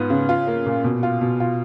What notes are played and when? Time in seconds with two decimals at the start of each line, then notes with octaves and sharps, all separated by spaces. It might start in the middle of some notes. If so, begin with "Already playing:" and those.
Already playing: G#2 B3 F4
0.10 C#3
0.29 F4
0.47 A#3
0.66 A#2
0.84 B2
1.03 F4
1.21 B2
1.40 F4